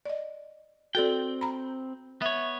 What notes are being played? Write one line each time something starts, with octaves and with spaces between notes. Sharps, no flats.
D5 D#5
C4 F#4 A4 D5 G5
A#5 B5
B3 C#5 E5